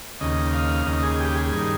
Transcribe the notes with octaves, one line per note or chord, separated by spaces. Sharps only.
D#2 C#3 D#5
F5
D#2 C#3 D#5
G#4
G4
G#4
G2 D#3